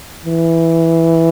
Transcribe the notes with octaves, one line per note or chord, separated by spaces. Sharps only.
E3